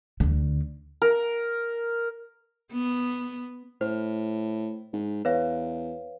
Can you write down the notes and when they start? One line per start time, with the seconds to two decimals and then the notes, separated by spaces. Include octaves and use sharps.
0.20 D2 D3
1.02 A#4
2.72 B3
3.81 A2 C5
4.93 G#2
5.25 E2 B4 C#5 F5